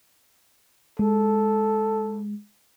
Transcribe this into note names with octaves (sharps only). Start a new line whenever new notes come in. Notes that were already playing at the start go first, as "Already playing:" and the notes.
G#3 A4